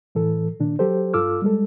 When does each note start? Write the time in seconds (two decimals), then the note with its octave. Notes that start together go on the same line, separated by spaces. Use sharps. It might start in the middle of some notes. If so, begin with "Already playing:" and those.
0.15 A2 E3 A4
0.60 A#2 D#3 D4
0.79 F#3 G4 A4 C5
1.14 G2 F4 A4 D6 E6 F6
1.42 G3 G#3 A4